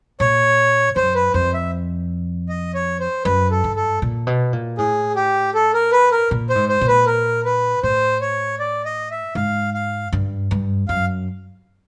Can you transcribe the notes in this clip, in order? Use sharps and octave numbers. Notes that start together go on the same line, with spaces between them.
A#2 C#5
F#2 C5
B4
F2 C5
E5
D#5
C#5
C5
F#2 B4
A4
G2
A4
A#2
B2
A#2
A2 G#4
G4
A4
A#4
B4
A#4
A#2
C5
G#2
C5
A#2
B4
A#4
B4
A2 C5
C#5
D5
D#5
E5
G#2 F5
F5
G2
G2
F#2 F5